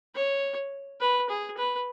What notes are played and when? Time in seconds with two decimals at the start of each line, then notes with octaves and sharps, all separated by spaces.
0.15 C#5
1.00 B4
1.29 G#4
1.57 B4